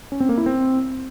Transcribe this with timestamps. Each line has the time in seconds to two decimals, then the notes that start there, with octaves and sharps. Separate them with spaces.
0.12 C#4
0.20 C4
0.29 A#3
0.38 E4
0.46 C4